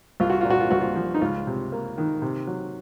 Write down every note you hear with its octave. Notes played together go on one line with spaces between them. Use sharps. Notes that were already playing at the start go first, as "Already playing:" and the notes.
C2 F4
F#4
A#2 F4
F#4
F4
C2 F#4
F4
F3
D#4
C#2 F4
C3
A#3
D#3
C3
F#3